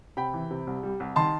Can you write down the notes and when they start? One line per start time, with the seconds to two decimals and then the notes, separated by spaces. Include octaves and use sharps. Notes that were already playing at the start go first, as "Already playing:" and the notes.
0.17 C3 G5 B5
0.34 E3
0.51 C3
0.67 C2
0.83 G3
1.00 C2
1.16 D#3 A5 C6